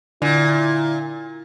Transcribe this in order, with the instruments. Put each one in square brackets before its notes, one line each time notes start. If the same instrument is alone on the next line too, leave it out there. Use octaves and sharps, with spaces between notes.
[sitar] A#2 [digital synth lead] D3 [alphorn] E4